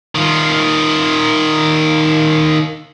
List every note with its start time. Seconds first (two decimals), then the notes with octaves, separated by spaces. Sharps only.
0.15 D#3 F4